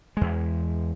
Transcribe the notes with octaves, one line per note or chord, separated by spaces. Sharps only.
E2 G#3